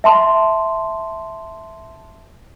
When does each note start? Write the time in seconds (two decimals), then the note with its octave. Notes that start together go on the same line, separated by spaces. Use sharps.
0.04 E5 A5 C6